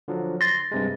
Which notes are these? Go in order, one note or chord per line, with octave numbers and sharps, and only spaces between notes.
D3 F3 F#3
C6 A6 A#6
G2 C3 G#3